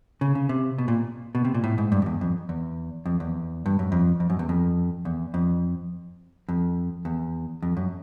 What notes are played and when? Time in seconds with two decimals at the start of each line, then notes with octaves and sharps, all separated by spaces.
0.21 C#3
0.35 C#3
0.49 C3
0.78 B2
0.88 A#2
1.35 B2
1.45 C3
1.54 A#2
1.64 A2
1.78 G#2
1.92 G2
2.02 F2
2.06 E2
2.21 F2
2.49 E2
3.06 F2
3.20 E2
3.66 G2
3.79 F#2
3.92 F2
4.20 F2
4.30 F#2
4.39 E2
4.49 F2
5.05 E2
5.34 F2
6.49 F2
7.05 E2
7.62 F2
7.77 F#2